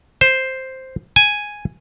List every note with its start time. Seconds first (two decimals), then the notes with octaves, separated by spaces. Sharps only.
0.21 C5
1.16 G#5